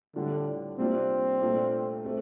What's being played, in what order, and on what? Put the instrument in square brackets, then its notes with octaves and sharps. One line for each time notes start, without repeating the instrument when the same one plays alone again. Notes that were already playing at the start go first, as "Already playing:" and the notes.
[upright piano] A2 G3 D4 F4 [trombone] D3
[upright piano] C3 G3 A#3 D4 F4 [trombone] C4
[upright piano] A#2 A3 D4 F4
A3 C4